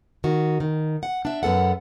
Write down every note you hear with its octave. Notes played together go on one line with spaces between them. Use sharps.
D#3 F#4
D#3
F#5
D4 E5
F#2 B3 A4 F#5